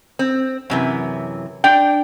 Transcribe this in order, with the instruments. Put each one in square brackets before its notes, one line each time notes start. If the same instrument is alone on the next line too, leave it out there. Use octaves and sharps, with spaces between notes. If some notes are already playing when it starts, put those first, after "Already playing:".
[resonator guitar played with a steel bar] C4
F#2 C3 E3
[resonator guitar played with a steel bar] D4 [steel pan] G5